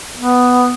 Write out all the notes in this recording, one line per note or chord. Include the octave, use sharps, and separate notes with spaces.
B3